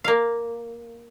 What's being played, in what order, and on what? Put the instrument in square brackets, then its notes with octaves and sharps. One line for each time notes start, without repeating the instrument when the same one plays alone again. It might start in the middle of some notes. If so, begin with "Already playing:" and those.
[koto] A#3 F5